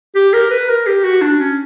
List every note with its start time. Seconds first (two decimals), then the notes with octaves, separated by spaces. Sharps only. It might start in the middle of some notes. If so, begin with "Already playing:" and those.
0.15 G4
0.33 A#4
0.51 B4
0.69 A#4
0.87 G4
1.04 F#4
1.22 D4
1.39 C#4